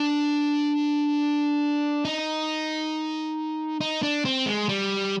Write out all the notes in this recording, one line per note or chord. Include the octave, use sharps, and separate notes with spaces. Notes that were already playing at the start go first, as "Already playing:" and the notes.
Already playing: D4
D#4
D#4
D4
C4
G#3
G3